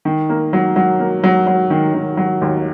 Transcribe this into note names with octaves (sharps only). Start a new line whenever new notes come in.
D#3
A#3
F#3
F#3
A#3
F#3
F#3
D#3
D#3
F#3
D#2